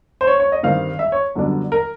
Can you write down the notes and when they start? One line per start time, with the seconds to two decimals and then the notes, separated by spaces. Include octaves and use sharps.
0.21 C5
0.27 C#5
0.40 C#5
0.52 D#5
0.63 G2 D#3 G3 C4 F5
0.99 E5
1.12 C#5
1.35 F#2 D3 G3 B3 D4
1.72 A#4